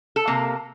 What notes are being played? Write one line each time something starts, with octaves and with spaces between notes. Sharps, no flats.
A4
C3 A#3